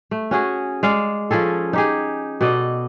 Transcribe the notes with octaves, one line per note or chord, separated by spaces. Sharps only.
A3
C#4 F#4 G#4
G#3 D5 F5
F3 C#4 G#4 A4
D#4 G4 G#4
B2 A4 D5 D#5